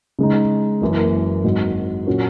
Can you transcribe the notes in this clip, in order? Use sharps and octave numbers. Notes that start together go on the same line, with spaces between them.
C#3 G#3 D#4
F#1 F#2 E3 A#3
G#1 G#2 F#3
A#2 F#3 C#4 F#4